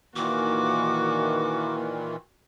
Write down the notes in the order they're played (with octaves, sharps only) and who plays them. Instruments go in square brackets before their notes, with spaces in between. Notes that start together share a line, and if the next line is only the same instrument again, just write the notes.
[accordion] A#2 D#3 E3 [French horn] A#3 [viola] F#4 [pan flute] D6